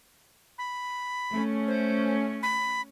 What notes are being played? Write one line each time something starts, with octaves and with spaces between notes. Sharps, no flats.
B5
A3 C#4
C5
B5